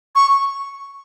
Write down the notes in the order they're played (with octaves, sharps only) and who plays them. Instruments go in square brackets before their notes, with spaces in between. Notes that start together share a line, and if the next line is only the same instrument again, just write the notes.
[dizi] C#6